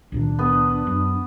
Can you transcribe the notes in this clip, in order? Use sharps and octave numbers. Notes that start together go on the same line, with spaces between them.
C#2 A#2 D#3 D4
B3
F#2